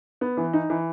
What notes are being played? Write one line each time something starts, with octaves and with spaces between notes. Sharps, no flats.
B3
E3
D#4
E3